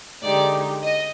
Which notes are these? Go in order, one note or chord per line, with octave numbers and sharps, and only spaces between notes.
D3 G#3 D#4 G4 D5
D#5